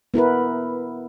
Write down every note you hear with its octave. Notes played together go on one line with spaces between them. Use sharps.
B3 E4 A#4 B4